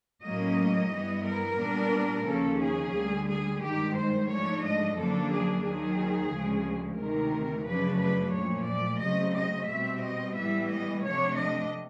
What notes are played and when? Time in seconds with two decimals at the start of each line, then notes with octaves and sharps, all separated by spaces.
0.24 A2 F#3 A#3 C#4 D#5
0.91 G2 E3 G3 B3
1.25 A#4
1.59 A#2 G3 B3 D4
2.26 D#2 C#3 F3 A#3 C#4 A4
2.60 G#4
2.94 D2 D3 G3
3.27 G#4
3.61 G2 D#3 G#3 G4
3.95 C5
4.29 G#2 F3 A3 D4 C#5
4.62 D#5
4.96 F#2 D3 F3 A#3 D4 A4
5.30 G#4
5.64 D#2 D#3 F#3 G#4
6.32 D2 C#3 F3 G#3
6.99 D2 C3 D#3 A#4
7.66 F#2 C#3 F3 A3 D4 B4
8.00 B4
8.34 A#2 F3 A3 C#5
8.68 D5
9.02 C#3 F#3 A3 C4 D#5
9.36 D#5
9.69 B2 G3 C4 E5
10.03 D#5
10.36 A2 E3 G3 B3 E5
10.70 D#5
11.04 C3 F3 A3 D4 C#5
11.38 D#5